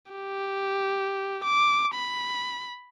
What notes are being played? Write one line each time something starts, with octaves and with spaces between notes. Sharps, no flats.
G4
D6
B5